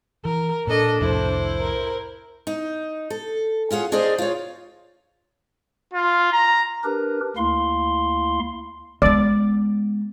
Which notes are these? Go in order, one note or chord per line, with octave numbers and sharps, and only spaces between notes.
E3 A#4
A#2 D4 A4 D#5
C2 F2 A2 E4 C5
A#4
D#4
A4
C#4 F4 G#4 F#5
D4 G#4 A#4 C5 D5 D#5
F4 C#5
F4
A#5
D4 G4 A#4 B4
D2 A#3 E4 F5 C6
G#3 B3 D5